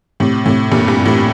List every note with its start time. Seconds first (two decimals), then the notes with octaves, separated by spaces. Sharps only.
0.20 A2 C3
0.46 A2 C3
0.72 G2 A#2
0.88 G2
1.05 A2